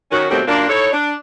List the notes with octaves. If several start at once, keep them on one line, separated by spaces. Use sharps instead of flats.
D#3 C#4 F#4
B2 D#3 F#3 G3 A3 C4
F#2 A#2 A#3 D4
D#4 E4 A4 C#5
D4